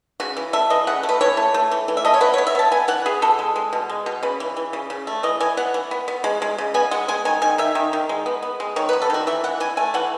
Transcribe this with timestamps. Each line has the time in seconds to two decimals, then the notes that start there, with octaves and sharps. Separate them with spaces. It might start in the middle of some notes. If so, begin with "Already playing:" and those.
0.20 C#3 F#4
0.37 E3
0.53 A3 E5
0.70 E3 D#5
0.87 C#3 F#5
1.03 A3
1.09 B4
1.21 E3 C#5
1.37 A3
1.54 A3
1.71 E3
1.88 E3
1.97 E5
2.05 A3 D#5
2.14 C#5
2.21 B3 B4
2.34 C#5
2.38 B3
2.47 E5
2.55 B3 A5
2.72 B3 G#5
2.88 E3 F#5
3.06 B3 G#4
3.22 B2 A4
3.39 G#3
3.56 G#3
3.73 B2
3.89 G#3
4.06 B2
4.23 C#3 B4
4.40 E3
4.57 E3
4.73 C#3
4.90 C#3
5.07 A3
5.23 E3 D#5
5.40 E3 G#5
5.57 B3 F#5
5.74 E3
5.91 B3
6.08 B3
6.24 G#3
6.42 G#3
6.58 C#3
6.74 B3 G#5
6.91 G#3 F#5
7.08 G#3 G#5
7.25 D#3 G#5
7.42 D#3 G#5
7.58 D#3 E5
7.75 D#3
7.93 D#3
8.09 G#3
8.26 B3
8.42 B3
8.60 G#3
8.76 D#3 C#5
8.89 B4
8.93 B3
9.02 A4
9.10 D#3 F#4
9.27 E3 E5
9.44 E3 F#5
9.60 E3 G#5
9.77 A3 G#5
9.94 E3 F#5